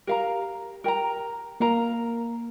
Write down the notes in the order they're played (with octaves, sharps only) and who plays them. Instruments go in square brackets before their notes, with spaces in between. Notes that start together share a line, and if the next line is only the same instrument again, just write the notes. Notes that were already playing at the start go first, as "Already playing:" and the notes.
[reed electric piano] G4 [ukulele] A#4 F5 A#5
[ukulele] A#4 G5 A#5
[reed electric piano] A#3 [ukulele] A#4 F5 A#5